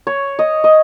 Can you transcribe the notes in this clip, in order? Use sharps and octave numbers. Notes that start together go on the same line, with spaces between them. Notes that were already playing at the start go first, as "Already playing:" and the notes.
C#5
D#5
D#5